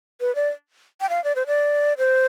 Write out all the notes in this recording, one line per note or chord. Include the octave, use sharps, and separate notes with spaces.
B4
D5
G5
F5
D5
C5
D5
C5